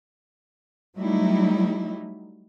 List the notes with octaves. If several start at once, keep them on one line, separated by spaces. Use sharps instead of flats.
F#3 G3 A3 D#4 E4